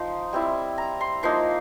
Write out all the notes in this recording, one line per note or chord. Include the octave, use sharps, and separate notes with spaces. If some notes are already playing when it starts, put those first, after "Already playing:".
Already playing: F3 D#4 C6
G3 C4 E4
A#5
C6
F3 A#3 D#4 C6